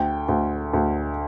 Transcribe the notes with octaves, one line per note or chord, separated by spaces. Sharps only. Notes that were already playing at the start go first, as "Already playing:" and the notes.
Already playing: D2 G5
D2
D2